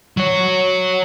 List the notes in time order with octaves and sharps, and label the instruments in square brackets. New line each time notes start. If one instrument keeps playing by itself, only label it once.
[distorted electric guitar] F#3 C#5